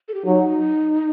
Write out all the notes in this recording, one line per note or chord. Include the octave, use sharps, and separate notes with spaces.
A4
G4
F#3 D#4